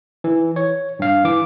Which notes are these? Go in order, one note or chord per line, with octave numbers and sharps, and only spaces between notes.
E3
C#5
G2 F5
E3 D6